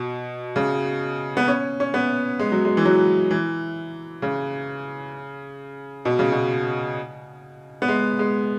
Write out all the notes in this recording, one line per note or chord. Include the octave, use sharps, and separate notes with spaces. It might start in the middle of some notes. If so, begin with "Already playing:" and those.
Already playing: B2
C#3
B3
C#4
C#4
B3
G#3
F#3
G#3
E3
F#3
E3
C#3
B2
C#3
B2
B3
G#3
G#3